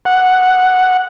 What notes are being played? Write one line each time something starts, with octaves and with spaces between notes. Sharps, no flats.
F#5